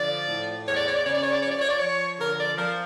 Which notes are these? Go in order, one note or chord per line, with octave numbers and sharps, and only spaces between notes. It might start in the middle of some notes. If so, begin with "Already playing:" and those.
Already playing: D3 F3 D5
A2
E2 C#5
D5
C#5
D5
C#3 C#5
D5
C#5
D5
F3 C#5
D5
C#5
D5
F3 C#5
D3 A#4
D5
F3 A#4